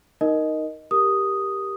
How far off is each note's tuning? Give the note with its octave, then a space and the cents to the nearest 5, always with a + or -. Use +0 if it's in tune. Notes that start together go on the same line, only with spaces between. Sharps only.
D#4 +0 A#4 +0 D#5 +0
G4 +0 A#4 +0 D#6 +0